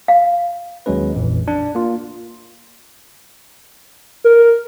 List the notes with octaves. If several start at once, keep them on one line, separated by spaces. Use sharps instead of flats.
F5
D#2 F#3 G#3 C#4 B4
A#1 F2 A#2 E3
D4
A#3 F4
A#4